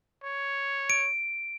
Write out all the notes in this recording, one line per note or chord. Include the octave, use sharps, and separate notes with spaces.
C#5
D7